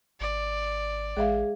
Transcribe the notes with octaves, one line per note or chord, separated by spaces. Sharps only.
G#1 D5
A1 G#3 G#4 E5 F5